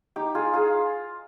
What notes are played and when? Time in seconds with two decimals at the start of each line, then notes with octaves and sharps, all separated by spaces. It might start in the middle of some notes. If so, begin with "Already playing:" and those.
0.16 D#4 G4
0.35 F4 G#4
0.53 F4 G#4